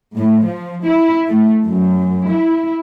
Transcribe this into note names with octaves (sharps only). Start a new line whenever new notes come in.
A2
F3
E4
A3
F#2
E4